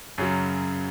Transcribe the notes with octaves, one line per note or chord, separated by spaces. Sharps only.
F#2 C#3 F#3